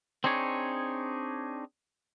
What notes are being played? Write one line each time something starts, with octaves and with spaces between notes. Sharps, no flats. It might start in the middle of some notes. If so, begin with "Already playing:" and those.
C4 D4 D#4 G#4 C#5